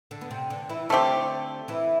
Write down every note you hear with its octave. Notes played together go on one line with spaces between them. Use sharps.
D3 D4
B3
C3 C4
D3 D4
E3 E4
D3 A3 C4 D4 G4
E3 E4